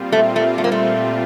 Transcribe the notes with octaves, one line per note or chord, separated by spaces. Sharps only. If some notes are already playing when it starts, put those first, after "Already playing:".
Already playing: A#2 G3 C4 F4
A3
A3
A3
A#3
A3